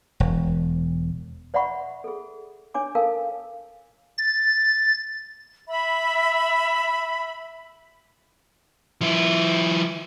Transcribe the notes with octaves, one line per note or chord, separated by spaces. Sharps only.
E1
C5 D5 E5 F#5 B5 C#6
G#4 A4
D4 C#5 G#5 D6
A4 A#4 F5 A5
A6
E5 B5
F3 E4